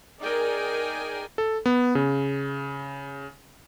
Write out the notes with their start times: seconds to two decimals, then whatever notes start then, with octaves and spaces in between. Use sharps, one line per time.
0.21 D#4 G#4 A#4 D5 G5 G#5
1.38 A4
1.66 B3
1.95 C#3